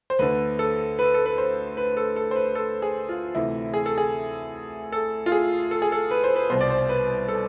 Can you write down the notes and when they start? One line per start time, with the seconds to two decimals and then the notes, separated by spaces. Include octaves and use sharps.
0.10 C5
0.19 D2 D3 B4
0.59 A4
0.99 B4
1.14 A4
1.26 B4
1.38 C5
1.77 B4
1.97 A4
2.16 A4
2.31 C5
2.36 B4
2.55 A4
2.82 G#4
3.09 F4
3.35 D2 C3 E3 E4
3.74 G#4
3.86 A4
3.98 G#4
4.92 A4
5.26 F4
5.32 G#4
5.71 A4
5.82 G#4
5.92 A4
6.11 B4
6.24 C5
6.36 B4
6.50 C2 B2 C5
6.61 D5
6.70 C5
6.89 B4
7.28 A4